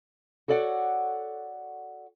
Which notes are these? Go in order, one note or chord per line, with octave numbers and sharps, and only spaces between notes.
F#4 A4 C#5 D5 F5 F#5